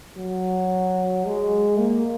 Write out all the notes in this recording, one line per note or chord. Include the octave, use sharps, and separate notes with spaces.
F#3
G#3
A#3